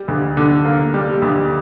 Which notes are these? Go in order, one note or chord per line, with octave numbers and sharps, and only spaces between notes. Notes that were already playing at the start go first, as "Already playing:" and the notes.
Already playing: G3
D2
D3
A#3
G3
D2